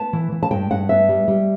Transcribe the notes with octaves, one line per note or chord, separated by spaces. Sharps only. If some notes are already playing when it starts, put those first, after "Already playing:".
Already playing: B3 A5
E3
E3
A5
G2 G5
G2 F#5
B3 E5
G3
G3